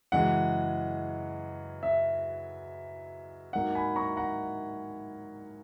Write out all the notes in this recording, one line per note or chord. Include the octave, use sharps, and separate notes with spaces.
F#2 C#3 E3 G#3 F#5
E5
G#2 F#3 A#3 F#5
G#5 B5
A#5 C#6
F#5 A#5